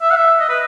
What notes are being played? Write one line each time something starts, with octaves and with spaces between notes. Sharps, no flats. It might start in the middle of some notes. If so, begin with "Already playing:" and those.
E5
F#5
E5
D#5
B4